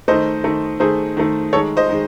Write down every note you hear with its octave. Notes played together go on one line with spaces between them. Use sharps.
D#3 A3 C5 D#5
D#3 A3
D#3 A3 G#4 C5
D#3 A3
D#3 G#3 A4 C#5
C5 D#5
D#3 G#3